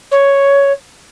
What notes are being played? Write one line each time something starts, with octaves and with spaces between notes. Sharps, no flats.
C#5